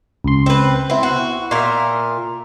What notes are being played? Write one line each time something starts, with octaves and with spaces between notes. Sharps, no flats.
C#2 C6
C4 B4
B3 C4 E4
F#4
A#2 A#4 E5 F5